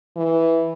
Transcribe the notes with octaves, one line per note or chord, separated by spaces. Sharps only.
E3